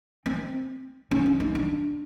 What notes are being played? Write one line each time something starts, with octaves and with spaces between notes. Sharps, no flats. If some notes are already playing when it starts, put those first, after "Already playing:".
C4
C#4
D4
D#4
D4